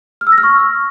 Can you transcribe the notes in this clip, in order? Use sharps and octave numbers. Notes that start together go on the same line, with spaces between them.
F6
E6
A#6
F6
C#6